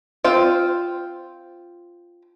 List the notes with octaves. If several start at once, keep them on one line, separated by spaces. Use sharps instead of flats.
C4 F4 C5